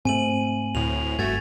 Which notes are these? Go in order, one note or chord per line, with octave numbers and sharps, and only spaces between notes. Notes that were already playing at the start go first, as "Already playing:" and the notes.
G#2 A3 C4 G#5 D#7 F#7
D2 A2 F7
F#1 G2 A3 F#4 G#6 A6